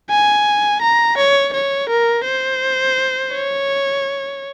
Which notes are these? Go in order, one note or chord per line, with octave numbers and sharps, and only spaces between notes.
G#5
A#5
C#5
C#5
A#4
C5
C#5